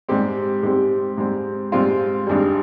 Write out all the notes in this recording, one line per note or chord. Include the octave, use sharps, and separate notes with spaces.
G#2 G3 C4 G4
G#2 G3 C4 G4
G#2 G3 C4
G#2 G3 C4 F4
G#1 G2 G3